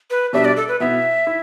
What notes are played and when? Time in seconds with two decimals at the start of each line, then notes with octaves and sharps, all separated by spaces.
0.10 B4
0.33 B2 G3 D4 E5
0.45 D5
0.57 A4
0.68 B4
0.80 B2 B3 E4 E5
1.27 E4